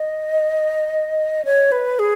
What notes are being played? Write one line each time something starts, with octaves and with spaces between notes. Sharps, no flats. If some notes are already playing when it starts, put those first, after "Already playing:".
Already playing: D#5
C#5
B4
G#4